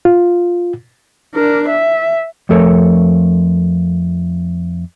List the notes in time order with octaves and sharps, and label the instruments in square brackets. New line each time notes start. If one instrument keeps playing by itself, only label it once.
[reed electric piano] F4
[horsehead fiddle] D4 A#4
E5
[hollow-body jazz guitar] F2 F3 A3 A4 A#4 C#5